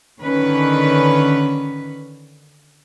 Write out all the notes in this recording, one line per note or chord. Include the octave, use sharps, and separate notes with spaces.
D3 D#3 C#4 B4